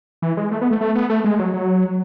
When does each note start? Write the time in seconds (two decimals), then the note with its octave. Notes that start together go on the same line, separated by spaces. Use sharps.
0.22 E3
0.37 G#3
0.51 A3
0.61 B3
0.71 A3
0.81 A3
0.95 B3
1.10 A3
1.24 G#3
1.39 F#3
1.53 F#3